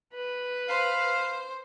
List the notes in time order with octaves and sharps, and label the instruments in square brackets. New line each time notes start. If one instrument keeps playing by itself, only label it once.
[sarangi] B4
[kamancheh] C5 [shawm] F5